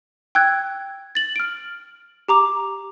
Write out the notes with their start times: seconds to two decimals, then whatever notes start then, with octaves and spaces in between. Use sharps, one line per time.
0.35 G5 E6 F#6 G#6
1.15 A6 F#7
1.36 F6 D7
2.28 G4 A#5 D6